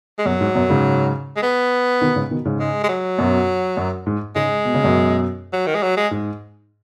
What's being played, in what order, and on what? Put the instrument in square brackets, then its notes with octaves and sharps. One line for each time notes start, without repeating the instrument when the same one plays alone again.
[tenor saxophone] G#3
[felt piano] F#2 B2 [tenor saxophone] F#3
[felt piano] G#2
F#2 B2
G#2 C#3
[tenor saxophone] G#3
B3
[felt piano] B2 D#3
G#2 C#3
B2 D#3
G#2 C#3
[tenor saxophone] G#3
G#3
F#3
[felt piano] F#2 B2
F#2
G#2
[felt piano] G#2 C#3 [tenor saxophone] G#3
[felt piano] B2
C#3
F#2 B2
[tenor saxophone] F#3
D#3
G#3
F#3
G#3
[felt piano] G#2